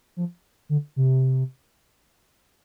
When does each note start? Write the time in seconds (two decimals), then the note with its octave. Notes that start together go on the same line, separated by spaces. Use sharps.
0.17 F3
0.69 D3
0.96 C3